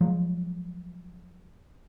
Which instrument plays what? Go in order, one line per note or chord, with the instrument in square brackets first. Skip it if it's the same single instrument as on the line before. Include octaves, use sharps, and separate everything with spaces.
[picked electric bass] F3 F#3 G#3